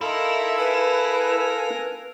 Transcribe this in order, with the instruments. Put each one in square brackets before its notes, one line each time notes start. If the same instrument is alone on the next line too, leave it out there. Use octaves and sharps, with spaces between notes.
[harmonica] D#4 A#4 C6 [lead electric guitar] E4 [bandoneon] A4 F5 E6
[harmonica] A#4 G#5 [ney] B4